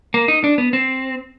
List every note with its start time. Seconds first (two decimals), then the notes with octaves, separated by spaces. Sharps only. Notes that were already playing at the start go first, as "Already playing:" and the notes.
0.14 A#3
0.28 D#4
0.44 D4
0.58 B3
0.73 C4